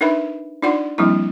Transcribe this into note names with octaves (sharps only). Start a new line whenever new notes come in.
D4 D#4 A#4 B4 E5 B5
D4 D#4 F4 D5 F#5 C6
F3 G3 A#3 C4 D4 E4